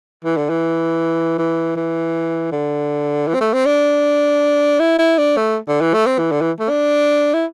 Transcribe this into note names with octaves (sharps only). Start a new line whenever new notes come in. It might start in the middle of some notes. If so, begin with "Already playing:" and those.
E3
D3
E3
E3
E3
D3
E3
C4
A3
C4
D4
E4
E4
D4
A3
D3
E3
A3
C4
E3
D3
E3
A3
D4
E4